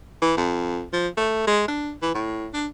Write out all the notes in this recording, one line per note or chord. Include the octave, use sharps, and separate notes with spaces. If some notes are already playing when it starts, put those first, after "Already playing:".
E3
F2
F3
A3
G#3
D4
E3
A2
D4